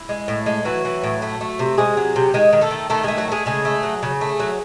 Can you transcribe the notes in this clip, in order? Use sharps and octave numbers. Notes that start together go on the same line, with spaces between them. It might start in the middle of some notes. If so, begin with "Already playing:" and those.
Already playing: E4
G#3
A2
G#3
E3 F#3 F#4
E3
A2
A3
A3
C3
C3 G#3 G#4
F#3
C3
D#3 G#3 G#4
D#3
A3 A4
D#3
D#3 A3 A4
G#3 A3 G#4
F#3 F#4
G#3 A3 G#4
C#3 G#3 G#4
A3
F#3
C#3
A3
F#3